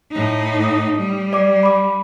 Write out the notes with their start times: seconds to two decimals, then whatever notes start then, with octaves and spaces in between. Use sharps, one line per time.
0.11 A2 D#4
0.64 D#6
0.97 G3
1.33 D5 D6
1.63 B5 D6